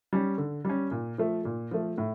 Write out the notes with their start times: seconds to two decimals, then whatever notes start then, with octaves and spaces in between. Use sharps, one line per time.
0.13 G3 C#4
0.38 D3
0.65 G3 C#4
0.91 A#2
1.18 F3 A3
1.45 A#2
1.71 F3 A3
1.98 A2